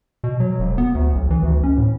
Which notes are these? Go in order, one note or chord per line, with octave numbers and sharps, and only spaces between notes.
B2
F#3
E1
B3
D2
B1
E3
D2
C#4
A2